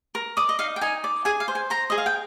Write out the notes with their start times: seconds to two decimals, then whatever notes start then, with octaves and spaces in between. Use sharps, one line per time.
0.15 A#4
0.37 D5 D#6
0.49 D#5
0.59 D#4 F5
0.76 G5
0.81 D#4 G#5
1.04 D5
1.25 G#4 G#5
1.40 F5
1.48 C5
1.55 G#5
1.70 C5 A#5
1.90 G#4 D#5
1.98 F5
2.06 G5